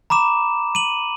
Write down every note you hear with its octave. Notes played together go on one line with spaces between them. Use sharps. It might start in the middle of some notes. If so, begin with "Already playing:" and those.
A#5 B5 D6 E7
D#7 F#7